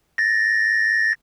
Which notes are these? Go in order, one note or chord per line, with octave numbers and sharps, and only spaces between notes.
A6 A#6